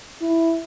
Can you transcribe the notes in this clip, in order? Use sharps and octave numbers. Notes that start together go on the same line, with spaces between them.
E4